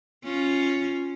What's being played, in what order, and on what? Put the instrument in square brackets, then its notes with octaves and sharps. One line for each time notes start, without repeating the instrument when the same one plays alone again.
[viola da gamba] C#4 F4